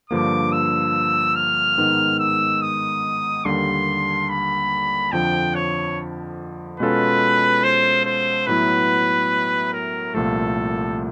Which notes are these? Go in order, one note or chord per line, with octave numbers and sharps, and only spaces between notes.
G2 D3 F3 A#3 D6
E6
F6
G#2 D#3 G#3 B3 D#4
E6
D#6
D#2 D3 G3 A#3 C6
B5
F2 D3 F3 G5
C#5
B2 G#3 C#4 F4 A4 B4
C5
C5
A2 F#3 B3 E4 B4
A#4
C2 A#2 F3 A3 A4